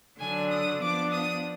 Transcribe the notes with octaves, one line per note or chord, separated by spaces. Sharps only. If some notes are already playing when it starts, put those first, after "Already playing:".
D3 F#3 D4 G#5
D#6
F3 B3 D4 D6
D#6